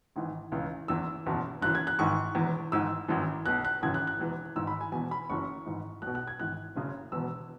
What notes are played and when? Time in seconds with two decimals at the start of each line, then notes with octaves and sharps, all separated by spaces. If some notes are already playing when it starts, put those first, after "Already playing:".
0.16 G#1 G#2 E3
0.52 C#2 C#3 E3
0.88 F#1 E2 E3 E6
1.26 F#1 E2 B2
1.62 F#1 F#2 E3 F#6
1.75 G#6
1.87 F#6
1.99 G#1 G#2 E3 C#6
2.35 E1 E2 E3
2.72 G#1 G#2 E3 E6
3.08 G#1 F#2 E3
3.46 B1 B2 F#6
3.65 F#6
3.82 G#1 F#2 C#3 E3 G#6
3.94 F#6
4.07 F#6
4.18 E1 E2 E3
4.56 G#1 G#2 E3 E6
4.67 B5
4.81 G#5
4.92 E1 E2 B2 G#5
5.11 B5
5.30 F#1 F#2 E3 C#6
5.65 G#1 G#2 E3
6.02 B1 B2 F#6
6.15 F#6
6.27 G#6
6.40 G#1 G#2 E3 F#6
6.76 F#1 F#2 C#3
7.12 E1 E2 B2 E6